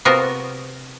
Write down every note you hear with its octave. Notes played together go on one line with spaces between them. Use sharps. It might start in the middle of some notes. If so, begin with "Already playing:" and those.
C3 B3 F4 F#4 A#4 D#5